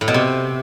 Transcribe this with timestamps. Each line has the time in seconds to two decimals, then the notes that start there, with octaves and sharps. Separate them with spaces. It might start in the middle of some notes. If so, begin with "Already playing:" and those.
0.01 A2
0.08 B2
0.14 C3